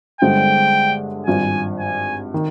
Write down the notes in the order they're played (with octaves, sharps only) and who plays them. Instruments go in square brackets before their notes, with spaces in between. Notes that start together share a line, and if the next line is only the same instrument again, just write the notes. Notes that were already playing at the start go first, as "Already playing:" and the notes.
[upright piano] G1 G2 D3 G#3 C4 [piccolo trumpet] G5
[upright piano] G#1 G2 F3 [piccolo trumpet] G#5
[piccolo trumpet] G#5
[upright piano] D#3